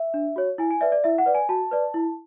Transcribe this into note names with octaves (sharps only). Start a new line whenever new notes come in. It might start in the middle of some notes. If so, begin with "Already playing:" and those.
Already playing: E5
D4
F#4 C#5
E4 G#5
G#5
B4 D5 E5
D5
E4 E5
F#5
B4 D5
G#5
F#4 A5
B4 D5
E4